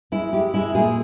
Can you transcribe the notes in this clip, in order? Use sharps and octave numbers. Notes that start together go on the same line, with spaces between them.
G#3 E4
G#3 G4
G#3 E4
A#2 G#4